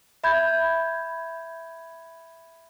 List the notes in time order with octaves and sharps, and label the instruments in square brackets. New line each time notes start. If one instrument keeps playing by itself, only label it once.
[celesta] E5 B5 G6 G#6